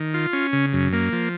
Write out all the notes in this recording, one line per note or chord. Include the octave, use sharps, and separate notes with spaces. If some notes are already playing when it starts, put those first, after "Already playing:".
Already playing: D#3
F4
C#4
C#3
F#2
A#3
F3